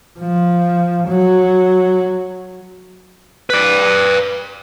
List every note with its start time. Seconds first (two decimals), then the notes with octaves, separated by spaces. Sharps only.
0.19 F3
1.08 F#3
3.50 B4 D5